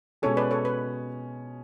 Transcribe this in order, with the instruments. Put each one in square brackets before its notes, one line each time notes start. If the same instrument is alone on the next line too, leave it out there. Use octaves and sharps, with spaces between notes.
[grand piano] B2 G#3 C#4 G#4 [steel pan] A4 C#5
[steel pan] B4 D5
A4 C#5
B4